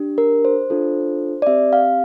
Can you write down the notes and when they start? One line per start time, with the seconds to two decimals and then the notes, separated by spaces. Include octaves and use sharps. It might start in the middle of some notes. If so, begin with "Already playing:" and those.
Already playing: D4 G4
0.18 A#4
0.45 C5
0.70 D4 F4 A4
1.42 D5
1.47 C4 G4 E5
1.73 F5